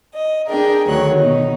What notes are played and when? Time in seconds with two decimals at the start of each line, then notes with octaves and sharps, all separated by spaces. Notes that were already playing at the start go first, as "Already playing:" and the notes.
0.14 D#5
0.48 D4 G#4 A#4 G5
0.87 D2 D#3 F#3 C#5 F#6
1.17 B2 D#4